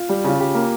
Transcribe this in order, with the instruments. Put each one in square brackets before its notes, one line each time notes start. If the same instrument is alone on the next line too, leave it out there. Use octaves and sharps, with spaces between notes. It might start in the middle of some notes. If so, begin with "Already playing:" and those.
Already playing: [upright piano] F4
[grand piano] G3
[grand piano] C#3 [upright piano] F4
[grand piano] C#3 [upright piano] G4
[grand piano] A#3